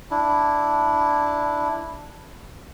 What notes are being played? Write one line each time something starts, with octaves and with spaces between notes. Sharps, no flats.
D4 E4